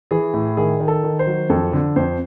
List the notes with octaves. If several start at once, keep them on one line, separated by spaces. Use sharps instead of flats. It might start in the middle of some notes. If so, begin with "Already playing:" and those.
E3 G#4
A2
D#3 G#4
D#3
A4
D#3
C5
F#3
F2 A4
D3
F2 C5